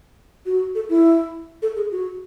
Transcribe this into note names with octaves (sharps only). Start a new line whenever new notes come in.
F#4
A4
E4
A4
G#4
F#4